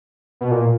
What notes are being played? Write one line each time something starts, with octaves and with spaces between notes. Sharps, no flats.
B2
A#2